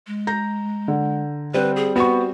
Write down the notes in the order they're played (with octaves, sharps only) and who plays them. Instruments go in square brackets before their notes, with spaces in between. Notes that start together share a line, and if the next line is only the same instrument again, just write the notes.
[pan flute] G#3
[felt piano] A#5 G6 A#6
[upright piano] D3
[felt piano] G3 C4 [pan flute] B4
[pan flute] G#4
[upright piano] B3 C#6 [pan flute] F#4